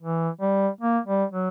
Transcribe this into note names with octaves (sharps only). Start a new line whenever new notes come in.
E3
G3
A#3
G3
F#3